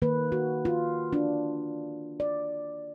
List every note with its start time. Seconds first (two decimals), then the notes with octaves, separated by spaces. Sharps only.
0.02 D#3 A#3 B4
0.32 F#4
0.65 F4
1.13 D4 F4
2.20 D5